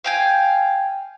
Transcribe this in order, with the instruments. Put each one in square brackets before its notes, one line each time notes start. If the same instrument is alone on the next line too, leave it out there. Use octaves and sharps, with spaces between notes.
[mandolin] F5 G5 G#5